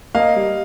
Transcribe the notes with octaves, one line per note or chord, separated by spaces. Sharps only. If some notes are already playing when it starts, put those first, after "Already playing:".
A#3 D#5 F5
G3